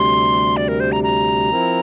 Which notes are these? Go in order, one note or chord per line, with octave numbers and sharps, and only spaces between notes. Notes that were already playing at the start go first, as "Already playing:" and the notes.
Already playing: D2 C3 G3 C6
D5
A#4
C5
A#5
A#5
F3 C4 E4 A#4